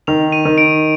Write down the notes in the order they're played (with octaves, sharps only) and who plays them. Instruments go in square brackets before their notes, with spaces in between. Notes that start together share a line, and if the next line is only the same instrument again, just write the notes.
[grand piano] D#3 [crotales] F7
[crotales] D#7
[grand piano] D#3
[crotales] D7